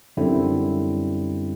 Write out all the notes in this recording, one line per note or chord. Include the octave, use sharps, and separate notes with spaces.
F#2 D3 G3 C4 E4